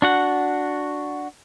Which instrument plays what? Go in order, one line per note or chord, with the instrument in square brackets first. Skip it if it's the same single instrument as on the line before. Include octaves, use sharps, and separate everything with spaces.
[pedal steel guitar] D4 F#4 F#5